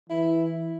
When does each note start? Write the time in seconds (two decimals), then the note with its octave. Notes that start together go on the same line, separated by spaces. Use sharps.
0.10 E3 E4